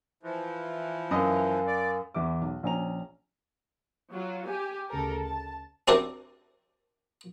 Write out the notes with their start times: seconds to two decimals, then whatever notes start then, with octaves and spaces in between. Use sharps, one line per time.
0.23 E3 F3
1.11 F#2 A#4 D#5 F5 G#5
1.67 D5
2.14 E2 E3 E5 D6
2.41 B1
2.63 A#1 C#4 G#5 A#5 F7
4.11 F#3 F4
4.47 G4 G#5
4.90 D2 C#3 A4 A#4
5.25 A5
5.88 C4 D4 E4 F#4 G4 A#4